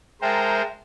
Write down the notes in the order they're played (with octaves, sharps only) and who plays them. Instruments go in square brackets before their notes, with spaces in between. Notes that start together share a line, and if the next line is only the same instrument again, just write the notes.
[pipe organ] G#3 A#4 C5 [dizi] E5 [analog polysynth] G5 A5 A#5